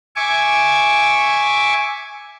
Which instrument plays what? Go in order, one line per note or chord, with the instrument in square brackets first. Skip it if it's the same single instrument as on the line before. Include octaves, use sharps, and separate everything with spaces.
[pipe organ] E5 G#5 C#6 D6